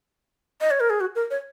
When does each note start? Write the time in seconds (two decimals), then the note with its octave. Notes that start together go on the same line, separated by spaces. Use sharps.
0.61 D#5
0.71 C#5
0.80 A#4
0.90 G#4
1.01 F#4
1.15 A#4
1.31 C#5